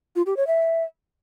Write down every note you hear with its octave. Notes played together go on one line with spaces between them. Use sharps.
F4
G4
C#5
E5